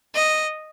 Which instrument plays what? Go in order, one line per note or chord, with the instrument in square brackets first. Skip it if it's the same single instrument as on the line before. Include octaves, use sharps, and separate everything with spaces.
[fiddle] D#5